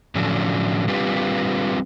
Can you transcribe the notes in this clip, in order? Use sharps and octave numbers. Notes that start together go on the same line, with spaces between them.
A2 D3 F3 F#3 C#4 D4
G3 C4 D4 F4 G4 B4